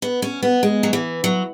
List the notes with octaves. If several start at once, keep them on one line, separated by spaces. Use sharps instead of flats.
B3
C#4
B3
G#3
F#3
E3
F#3